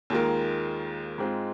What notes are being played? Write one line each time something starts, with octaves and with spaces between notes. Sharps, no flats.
D#2 D#3 G#3 F4 A#4
G#2 G#3 C4 F4